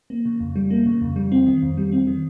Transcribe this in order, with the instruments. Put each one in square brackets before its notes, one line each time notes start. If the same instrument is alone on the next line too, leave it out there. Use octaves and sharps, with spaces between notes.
[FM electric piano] A#3
C#3
F2
G3
A#3
C#3
F2
G3
C4
D#3
F2
G3
C4
D#3